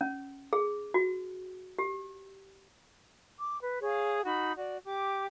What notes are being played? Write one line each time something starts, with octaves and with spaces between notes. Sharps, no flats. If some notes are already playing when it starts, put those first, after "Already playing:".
C#4
G#4
F#4
G4
D6
B4
G#4 C#5 F5
D#4 F#4 B5
F#4 D5
G4 D6